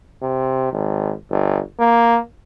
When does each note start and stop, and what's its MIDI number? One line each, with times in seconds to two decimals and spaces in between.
0.22 0.69 48
0.72 1.13 32
1.30 1.60 31
1.79 2.19 58